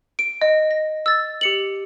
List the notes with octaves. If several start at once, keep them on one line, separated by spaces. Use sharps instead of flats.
D7
D#5
A#6
E6 A6
G4 C#7 F#7